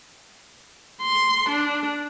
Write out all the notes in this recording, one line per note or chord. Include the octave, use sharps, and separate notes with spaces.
C6
D4